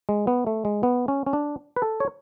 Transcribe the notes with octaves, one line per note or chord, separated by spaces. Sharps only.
G#3
B3
A3
G#3
B3
C#4
C#4
D4
B4
A4
C#5